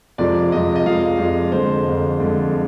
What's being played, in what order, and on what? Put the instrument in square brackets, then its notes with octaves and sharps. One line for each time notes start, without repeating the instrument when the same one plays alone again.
[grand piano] F2 C3 F3 G#3 D5
F2 C3 F3 G#3 D#5
D#5
F2 C3 F3 G#3 F5
F2 C3 F3 G#3
F2 D3 G#3 C5
F2 D3 G#3
F2 D3 G#3
G#3